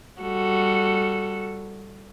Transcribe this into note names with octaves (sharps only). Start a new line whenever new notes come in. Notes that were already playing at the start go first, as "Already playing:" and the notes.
G3 F#4 A4